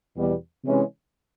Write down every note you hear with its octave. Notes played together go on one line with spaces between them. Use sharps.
E2 B2 G3 B3
C3 E3 G#3 C#4